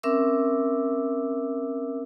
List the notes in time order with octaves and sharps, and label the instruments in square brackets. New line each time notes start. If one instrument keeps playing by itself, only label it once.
[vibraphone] C4 C#4 A#4 E5 D6 E6